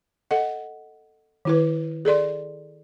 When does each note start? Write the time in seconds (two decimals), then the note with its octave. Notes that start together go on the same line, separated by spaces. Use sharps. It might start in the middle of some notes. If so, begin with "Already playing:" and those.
0.31 A4 D#5 F#5
1.45 D#3 E4 B4
2.05 G#4 A4 D5 C6